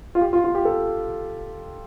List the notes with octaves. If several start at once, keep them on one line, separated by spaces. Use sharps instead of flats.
F4
G4
F4
F4
G4
A4